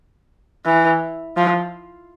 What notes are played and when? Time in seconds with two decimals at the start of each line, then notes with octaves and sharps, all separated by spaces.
0.65 E3
1.37 F3